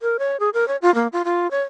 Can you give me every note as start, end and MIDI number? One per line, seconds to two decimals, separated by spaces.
0.01 0.17 70
0.19 0.37 73
0.40 0.49 68
0.54 0.67 70
0.68 0.77 73
0.82 0.94 65
0.95 1.07 58
1.13 1.23 65
1.25 1.50 65
1.51 1.62 73